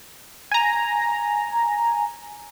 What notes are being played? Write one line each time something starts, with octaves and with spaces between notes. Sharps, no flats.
G#5 A#5